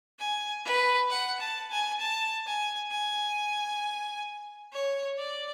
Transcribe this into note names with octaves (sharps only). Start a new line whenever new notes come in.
G#5
B4
F#5
A5
G#5
A5
G#5
G#5
C#5
D5